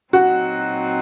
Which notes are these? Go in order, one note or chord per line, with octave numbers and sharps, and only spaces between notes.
A#2 F#3 C4 D#4 F#4